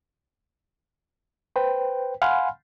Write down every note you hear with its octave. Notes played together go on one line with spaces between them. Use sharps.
B4 C5 G5
F5 F#5 G#5 B5 C6 F6